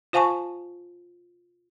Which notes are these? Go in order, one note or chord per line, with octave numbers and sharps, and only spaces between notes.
F4 C5 F5 G#5 A5 C#6